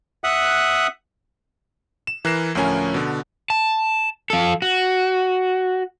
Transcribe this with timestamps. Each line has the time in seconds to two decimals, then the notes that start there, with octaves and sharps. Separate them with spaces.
0.24 E5 F#5 D#6 F#6
2.07 E7
2.25 E3 A#4 F#6 A#6 C7 E7
2.55 D2 A2 F3 C#4 A#4 G#5
2.94 B2 D3
3.50 A5
4.30 F3 A4
4.62 F#4